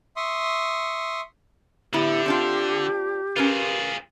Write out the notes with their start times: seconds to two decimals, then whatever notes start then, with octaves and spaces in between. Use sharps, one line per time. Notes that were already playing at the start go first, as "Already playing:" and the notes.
0.16 E5 C6 C#6 D#6
1.93 A2 D3 B3 E4 G4
2.26 C4 D4 F4
3.36 C#4 F4 G#4 A#4 B4